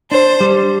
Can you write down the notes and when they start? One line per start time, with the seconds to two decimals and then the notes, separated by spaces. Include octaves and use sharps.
0.11 D4 C5
0.41 G3